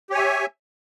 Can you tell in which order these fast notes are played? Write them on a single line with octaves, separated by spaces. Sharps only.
G4 C#5 G#5 E5